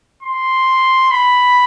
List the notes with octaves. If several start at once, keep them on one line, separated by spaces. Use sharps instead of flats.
C6
B5